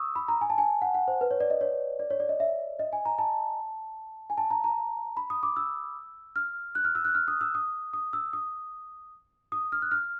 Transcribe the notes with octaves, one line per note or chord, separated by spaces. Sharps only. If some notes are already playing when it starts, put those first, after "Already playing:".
Already playing: C#6 D#6 E6
B5
A#5
G#5
A5
G#5
F#5
F#5
C5
B4
C#5
D5
D#5
C#5
D5
C#5
D5
D#5
E5
D#5
G#5
A#5
A5
G#5
A5
A#5
A#5
B5
D#6
D6
E6
F6
F#6
F6
E6
F#6
F6
D#6
E6
D#6
D#6
E6
D#6
D#6
F6
F#6
F6